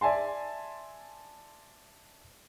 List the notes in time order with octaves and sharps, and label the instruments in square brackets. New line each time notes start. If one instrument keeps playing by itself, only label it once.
[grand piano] D5 E5 G#5 A5 C6